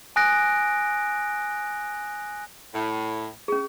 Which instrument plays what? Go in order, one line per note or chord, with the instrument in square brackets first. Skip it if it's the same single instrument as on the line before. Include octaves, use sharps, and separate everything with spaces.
[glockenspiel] G#5 D#6 F#6 A#6 D7
[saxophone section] A2
[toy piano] C#4 G#4